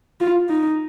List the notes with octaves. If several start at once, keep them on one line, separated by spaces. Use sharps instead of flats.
F4
D#4